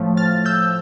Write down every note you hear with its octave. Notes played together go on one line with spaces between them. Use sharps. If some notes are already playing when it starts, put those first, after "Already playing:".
Already playing: A2 F3 A3
F6 A6
E6 G6